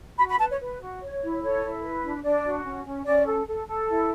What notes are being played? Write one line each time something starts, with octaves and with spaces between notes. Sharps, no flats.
F#4 B5
B5
B4 A5
C#5
B4
F#4
C#5
E4
A4 C#5
E4
B4
D4
D4 D5
F#4
C#4
C#4
C#4 D5
A4
A4
A4
E4